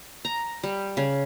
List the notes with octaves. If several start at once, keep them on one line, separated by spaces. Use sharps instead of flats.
A#5
G3
C#3